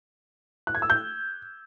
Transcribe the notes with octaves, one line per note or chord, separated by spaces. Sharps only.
F#6
G#6
E6
G6